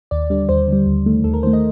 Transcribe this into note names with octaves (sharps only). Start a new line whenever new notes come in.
D#2 D5
D3 G3 D5
D#2 C5
D3 G3
D#2
D#3 A3
D#2 A4
A#4
D#3 A3 C5
D#5